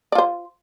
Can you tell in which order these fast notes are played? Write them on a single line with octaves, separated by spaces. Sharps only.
D5 F4 C5